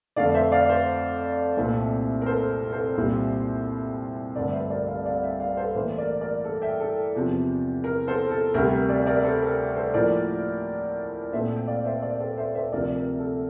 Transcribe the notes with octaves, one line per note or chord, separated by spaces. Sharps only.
F2 D3 A3 D5 F5
C5 E5
D5 F5
C5 E5
C2 A#2 A3 C4
A#4
A4 C5
A4 C5
C2 A#2 G3 C4
G2 D3 A3 C4 A#4 D5
C5 E5
A#4 D5
D5 F5
D5 F5
E5 G5
D5 F5
A4 C5
A2 E3 A#3 A4 C5
A#4 D5
A#4 D5
A4
E5 G5
A4
E2 C3 F3
A#4
A4 C5
A4
D2 C3 G3 A#4
A#4
A#4 D5
A#4 D5
A4 C5
A#4
A4 C5
A2 F3 A#3 A#4 D5
A#2 A3 C4 C5 E5
G5
D5 F5
C5 E5
A#4 D5
A4 C5
C5 E5
C5 E5
D2 C3 F3 C4 A#4 D5
A#4
A4